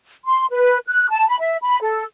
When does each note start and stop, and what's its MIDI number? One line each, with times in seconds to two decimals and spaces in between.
0.25 0.45 84
0.51 0.78 71
0.88 1.07 90
1.09 1.27 81
1.28 1.36 83
1.40 1.57 76
1.62 1.77 83
1.82 2.03 69